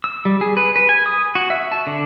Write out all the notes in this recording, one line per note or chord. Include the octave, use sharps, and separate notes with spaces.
E6
G3
G#4
B4
B4
G#5
D#6
F#4
E5
A5
D3